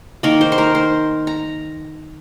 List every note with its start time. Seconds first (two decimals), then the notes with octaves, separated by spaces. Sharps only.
0.23 D#3 A#3 A#4
0.41 C5
0.52 C5
0.58 A#4
0.75 C5
1.27 A#5